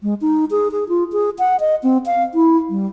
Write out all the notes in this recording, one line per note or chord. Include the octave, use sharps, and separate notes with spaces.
G#3
D#4
G#4
G#4
F4
G#4
F#5
D#5
C4
F5
E4
G3